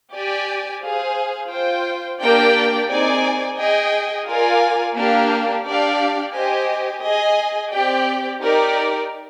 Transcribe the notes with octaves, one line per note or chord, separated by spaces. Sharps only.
G4 D5 G#5
G#4 C5 F5
F4 C5 G5
A#3 D4 G4 D5 G5
C4 D#4 G#4 D5 G#5
G#4 D#5 G5
F4 A#4 D5 F5 G#5
A#3 D4 G4 A#4 F5
D4 G4 D5 F5
G4 C5 D#5 G#5
G#4 D#5 G#5
C4 G4 D5 G5
D#4 G4 A#4 D5